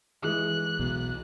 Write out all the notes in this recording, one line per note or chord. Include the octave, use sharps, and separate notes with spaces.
E3 G#3 F#6
B1 B2